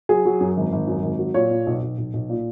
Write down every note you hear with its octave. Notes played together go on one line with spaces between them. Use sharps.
F#3 G#4
F#3
F#2
G#1
G#1
F#2
G#1
F#3
A#2 C#5
A#2
B1
B1
B1
B1
A#2